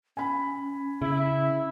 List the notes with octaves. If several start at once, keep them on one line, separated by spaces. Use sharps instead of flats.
C#4 G#5 B5
C#3 E4